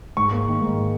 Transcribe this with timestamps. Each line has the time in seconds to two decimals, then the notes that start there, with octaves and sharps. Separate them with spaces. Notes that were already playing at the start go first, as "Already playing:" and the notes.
0.17 G#2 C#6
0.32 A#3
0.47 D#3
0.61 G#2